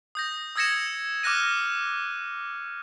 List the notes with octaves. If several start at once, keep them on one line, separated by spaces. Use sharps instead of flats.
D#6 G6 A#6
D#6 E6 G#6 A#6 C#7 E7
D6 F6 F#6 A#6 D#7